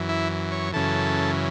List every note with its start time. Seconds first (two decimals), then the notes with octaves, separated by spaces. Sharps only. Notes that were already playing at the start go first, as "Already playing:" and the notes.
Already playing: F#2 E3
0.09 E4
0.52 C#5
0.73 F#2 C#3 E3 A4